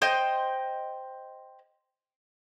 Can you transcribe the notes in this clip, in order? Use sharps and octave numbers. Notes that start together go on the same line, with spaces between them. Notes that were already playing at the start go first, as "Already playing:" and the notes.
C5 D#5 G5